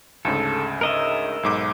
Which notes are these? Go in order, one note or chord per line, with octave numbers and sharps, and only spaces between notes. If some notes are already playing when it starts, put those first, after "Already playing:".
D2 G#2 C#3 A4
A#4 D#5 E5
B1 G#2 D6